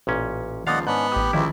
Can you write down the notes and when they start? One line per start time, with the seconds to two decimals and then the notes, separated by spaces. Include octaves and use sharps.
0.07 A1 A#2 C#4
0.67 C#2 D#3 F3 A#3 D5 D#5 F5 F#5
0.87 G#2 B3 C#4 D4 F#6
1.12 A1 G4 D#6
1.33 C#2 D3 D#3 F3 E4